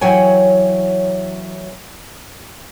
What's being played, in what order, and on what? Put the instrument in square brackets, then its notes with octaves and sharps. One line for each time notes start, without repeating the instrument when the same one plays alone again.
[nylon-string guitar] E3 F#3 G4 C#5 G5 G#5